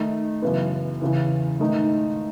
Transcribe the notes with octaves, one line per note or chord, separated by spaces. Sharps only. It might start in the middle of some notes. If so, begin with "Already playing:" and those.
Already playing: D#3 A3 D#4
F#2 C#3 E3 B3
E2 C#3 E3
G#2 D#3 A3 D#4